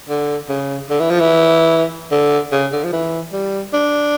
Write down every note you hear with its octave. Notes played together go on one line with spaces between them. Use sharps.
D3
C#3
D3
E3
F3
E3
D3
C#3
D3
F3
E3
G3
D4